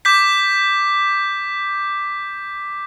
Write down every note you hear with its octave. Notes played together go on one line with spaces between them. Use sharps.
D6 G6 B6